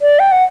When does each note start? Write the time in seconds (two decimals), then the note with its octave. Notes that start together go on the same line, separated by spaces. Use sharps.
0.01 D5
0.19 G5
0.32 F#5